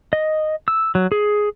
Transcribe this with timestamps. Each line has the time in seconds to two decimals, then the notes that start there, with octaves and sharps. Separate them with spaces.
0.13 D#5
0.68 E6
0.95 F#3
1.12 G#4